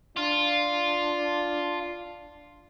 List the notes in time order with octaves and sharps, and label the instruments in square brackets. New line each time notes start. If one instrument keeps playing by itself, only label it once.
[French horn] D4 [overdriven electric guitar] F4